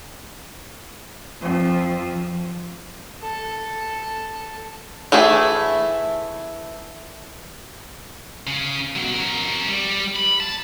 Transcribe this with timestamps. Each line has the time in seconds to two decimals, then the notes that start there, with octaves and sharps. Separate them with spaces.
1.42 F2
3.21 A4 A5
5.12 E3 A3 E4 G#4
8.47 C#3
8.96 B2 F#3
9.14 A#4 C#5
9.69 G3
10.16 B5
10.40 A5